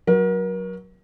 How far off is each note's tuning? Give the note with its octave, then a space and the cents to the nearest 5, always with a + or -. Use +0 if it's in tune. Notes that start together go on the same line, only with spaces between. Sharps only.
F#3 +0 A#4 +35